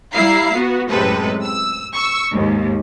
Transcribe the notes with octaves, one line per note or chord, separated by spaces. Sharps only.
G3 E4 F5 A#5 C7
B3 F#4
F#2 A2 C3 G#3 A4 B4
E6
C#6 E6
D#2 G#2